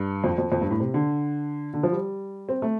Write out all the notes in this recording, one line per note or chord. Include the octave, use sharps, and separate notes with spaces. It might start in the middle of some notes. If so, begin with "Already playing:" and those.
Already playing: G2
F2
F2
F2
G2
A2
C3
D3
D3
F3
G3
C4
A3